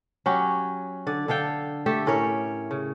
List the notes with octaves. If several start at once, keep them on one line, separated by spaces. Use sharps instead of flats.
F#3 C#4 G4
D3 D5
D3 A4 F5 G5
A3 G4 A4 E5
A2 C#4 A#4 C#5
C#3